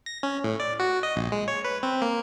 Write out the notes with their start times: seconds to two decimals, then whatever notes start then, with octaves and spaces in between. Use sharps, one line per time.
0.06 A#6
0.23 C#4
0.44 A2
0.60 D5
0.80 F#4
1.03 D#5
1.16 A#1
1.32 G#3
1.48 C#5
1.65 B4
1.83 C4
2.02 A#3